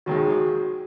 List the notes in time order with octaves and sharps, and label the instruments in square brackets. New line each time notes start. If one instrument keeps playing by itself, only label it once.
[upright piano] E1 D#2 D#3 G#3 [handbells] F#4
[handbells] G#4
F#4